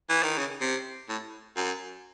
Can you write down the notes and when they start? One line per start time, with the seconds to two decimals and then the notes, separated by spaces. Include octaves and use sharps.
0.10 E3
0.23 D#3
0.38 C#3
0.61 C3
1.09 A2
1.57 F#2